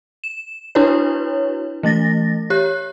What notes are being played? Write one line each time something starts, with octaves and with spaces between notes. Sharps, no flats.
E7
D4 E4 F#4 B4 C#5
E3 A3 A6 A#6
G4 C#5 F#6